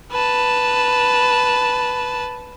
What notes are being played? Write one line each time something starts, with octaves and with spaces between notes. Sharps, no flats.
B4 A5